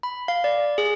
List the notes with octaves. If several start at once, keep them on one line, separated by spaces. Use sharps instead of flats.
B5
F5
D5
G#4